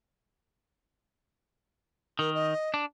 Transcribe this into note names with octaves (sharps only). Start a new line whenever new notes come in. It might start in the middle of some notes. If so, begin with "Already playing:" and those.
D#3 A#4
D#5
D4